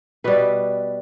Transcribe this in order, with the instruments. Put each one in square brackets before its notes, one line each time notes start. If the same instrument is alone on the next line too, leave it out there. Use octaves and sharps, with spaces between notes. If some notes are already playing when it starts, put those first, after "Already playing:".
[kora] B2 G3 B4